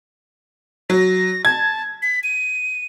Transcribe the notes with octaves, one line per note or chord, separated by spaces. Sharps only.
F#3 A#6
A5 G#6
B6
D#7